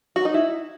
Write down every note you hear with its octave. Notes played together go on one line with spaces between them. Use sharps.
F#4
D#4
E4